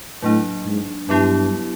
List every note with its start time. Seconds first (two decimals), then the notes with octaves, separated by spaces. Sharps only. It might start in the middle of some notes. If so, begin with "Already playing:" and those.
0.22 A2 F#3 A#3 D4
0.66 G#2
1.09 G2 F#3 B3 E4 G4